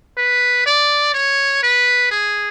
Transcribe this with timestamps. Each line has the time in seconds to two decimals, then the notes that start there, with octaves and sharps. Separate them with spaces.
0.18 B4
0.66 D5
1.14 C#5
1.63 B4
2.11 G#4